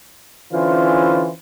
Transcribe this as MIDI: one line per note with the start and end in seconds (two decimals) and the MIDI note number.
0.53 1.30 50
0.53 1.30 52
0.53 1.30 61
0.53 1.30 64
0.53 1.30 65
0.53 1.30 72